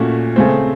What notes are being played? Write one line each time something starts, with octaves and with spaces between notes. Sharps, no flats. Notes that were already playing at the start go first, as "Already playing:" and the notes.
Already playing: A#2 A3 C#4 F#4
C#3 A3 C4